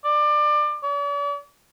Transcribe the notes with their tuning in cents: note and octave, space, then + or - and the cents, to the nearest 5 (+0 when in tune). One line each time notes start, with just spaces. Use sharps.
D5 +25
D5 -45